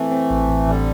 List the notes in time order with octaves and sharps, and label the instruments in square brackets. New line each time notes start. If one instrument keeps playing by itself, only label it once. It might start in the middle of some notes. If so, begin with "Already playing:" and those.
Already playing: [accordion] E3 A3 [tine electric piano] C4
[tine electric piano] C4
A1
A1
[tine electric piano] A1 [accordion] D3 G3